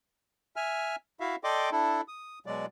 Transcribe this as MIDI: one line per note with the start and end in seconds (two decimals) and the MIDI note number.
0.56 0.96 76
0.56 0.96 80
0.56 0.96 89
1.20 1.36 64
1.20 1.36 66
1.20 1.36 76
1.20 1.36 77
1.44 1.70 69
1.44 1.70 74
1.44 1.70 75
1.44 1.70 79
1.44 1.70 84
1.44 1.70 86
1.72 2.01 62
1.72 2.01 64
1.72 2.01 69
2.08 2.39 87
2.46 2.66 47
2.46 2.66 54
2.46 2.66 56
2.46 2.66 74